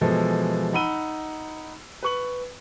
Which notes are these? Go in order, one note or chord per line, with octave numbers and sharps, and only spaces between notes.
B2 E3 F3 G#3 A4
D#4 F#5 B5 E6 D#7 G7
B4 C#6 F#7